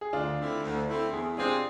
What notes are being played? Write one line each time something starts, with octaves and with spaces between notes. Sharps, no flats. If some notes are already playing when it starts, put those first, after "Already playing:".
G#4
D2 D4 F4
D3 A3 C4 E4
D2
D3 A3 C4 E4
E2 E4 G#4
C3 G#3 C4 D4 F4 G#4